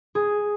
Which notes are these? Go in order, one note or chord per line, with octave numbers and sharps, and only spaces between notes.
G#4